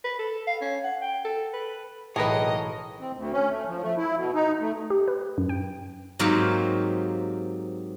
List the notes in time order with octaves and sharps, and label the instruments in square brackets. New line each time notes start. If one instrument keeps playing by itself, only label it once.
[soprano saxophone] B4
A4
F5
C#4
F#5
G5
A4
B4
[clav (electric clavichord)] B1 A2 [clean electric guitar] E3 A#4 C#5 [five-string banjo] G#4 B4 [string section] D#5
[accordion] C4
D2
C#4
A3
F3
A3
E4
B2
D#4
A3
[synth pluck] G4
B4
F#2
G5
[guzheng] G#2 F#3 A#3 C4 G4 F5